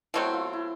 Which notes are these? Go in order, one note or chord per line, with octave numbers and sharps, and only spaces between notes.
B2 F#3 A3 C4 E4
F4
E4